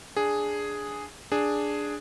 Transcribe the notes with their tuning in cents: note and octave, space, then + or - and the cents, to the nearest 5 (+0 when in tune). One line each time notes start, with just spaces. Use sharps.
D4 +0 G#4 +0
D4 +0 G#4 +0